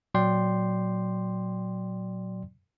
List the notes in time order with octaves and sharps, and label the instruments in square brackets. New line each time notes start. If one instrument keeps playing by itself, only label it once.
[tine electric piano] A#2 F#3 D5 G5 C6